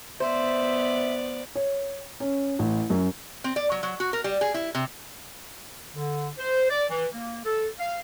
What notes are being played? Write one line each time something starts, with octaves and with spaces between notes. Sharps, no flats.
B3 C5 D5 E5
C#5
C#4
A1
F#2
C4
D5
F#3
F#3
F#4
A#4
G3
G#4
E4
C3
D3
C5
D5
E3
A#3
A4
F5